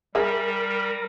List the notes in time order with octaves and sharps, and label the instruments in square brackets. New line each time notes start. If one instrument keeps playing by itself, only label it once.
[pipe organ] G3 [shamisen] G#4 E5 [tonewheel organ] A#4